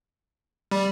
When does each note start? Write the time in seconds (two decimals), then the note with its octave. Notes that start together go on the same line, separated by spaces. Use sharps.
0.71 G3